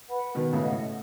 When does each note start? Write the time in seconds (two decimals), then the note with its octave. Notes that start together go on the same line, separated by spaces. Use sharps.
0.08 B4 F#5 B5
0.35 B2 D#3 B4
0.52 A2 C#3
0.63 D#5 F#5
0.71 A2